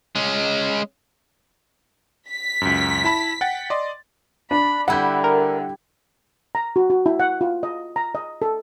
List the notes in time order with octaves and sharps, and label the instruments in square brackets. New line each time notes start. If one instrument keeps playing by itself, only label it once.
[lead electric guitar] G#3 C#4
[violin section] B6
[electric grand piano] C#2 F#2
E4 A5 B5
F#5 G5 A6
D5 D#5 C6
[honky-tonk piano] D4 [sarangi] B5
[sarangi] D3 [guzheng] G3 E4 [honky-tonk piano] F#5 G6
[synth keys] A#4
[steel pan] A#5
F#4
F#4
E4
F#5
F4
D#5
A#5
D#5
A4